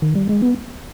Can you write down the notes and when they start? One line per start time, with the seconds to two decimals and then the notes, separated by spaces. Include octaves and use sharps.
0.02 D#3
0.15 G3
0.29 G#3
0.42 B3